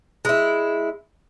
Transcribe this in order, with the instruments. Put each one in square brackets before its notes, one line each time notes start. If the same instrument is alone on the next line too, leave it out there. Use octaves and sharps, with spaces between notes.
[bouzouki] G#3 E4